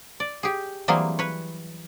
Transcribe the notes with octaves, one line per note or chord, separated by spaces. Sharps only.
D5
G4 G#4
E3 F#3 G3 A#3 C4 G#4
B4 C#5